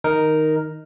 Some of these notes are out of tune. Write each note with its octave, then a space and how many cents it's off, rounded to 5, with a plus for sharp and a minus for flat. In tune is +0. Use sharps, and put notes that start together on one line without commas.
D#3 +0 D#4 +0 A#4 +0